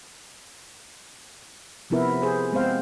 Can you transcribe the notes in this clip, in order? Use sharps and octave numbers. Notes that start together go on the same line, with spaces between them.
C3 F3 B3 E4 A#4 B4
G#4 C5
G#3 B3 C4 C5 F5